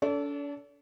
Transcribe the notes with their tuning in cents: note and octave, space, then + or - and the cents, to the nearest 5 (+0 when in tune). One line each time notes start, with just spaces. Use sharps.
D4 -45 A4 +0 D5 -40